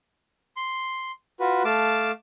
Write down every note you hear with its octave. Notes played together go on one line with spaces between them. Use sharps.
C6
F4 F#4 B4
A3 F5 A5 D6